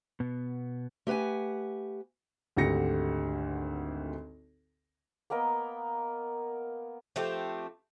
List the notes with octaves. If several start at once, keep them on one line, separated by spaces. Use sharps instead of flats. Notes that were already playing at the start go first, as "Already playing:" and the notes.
B2 B3
A3 G4 B4 F#5 G#5
G#1 D2 D3 G4 A#6 C#7
A#3 B3 A#4 D#5
F3 A3 C4 G4